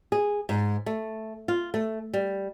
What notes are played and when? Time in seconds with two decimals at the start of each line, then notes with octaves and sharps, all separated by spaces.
0.12 G#4
0.49 G#2
0.86 A3
1.48 F4
1.74 A3
2.13 G3